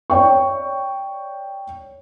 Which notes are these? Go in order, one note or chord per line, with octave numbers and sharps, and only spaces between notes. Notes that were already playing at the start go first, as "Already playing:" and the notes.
C#5 D5 G5 C#6